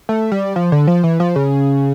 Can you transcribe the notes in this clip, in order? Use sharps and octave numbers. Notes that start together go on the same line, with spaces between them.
A3
G3
F3
D3
F3
E3
F3
C#3